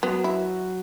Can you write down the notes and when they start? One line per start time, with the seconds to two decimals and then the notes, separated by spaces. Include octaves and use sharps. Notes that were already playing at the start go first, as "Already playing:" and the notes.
0.03 F#3 B3
0.24 E4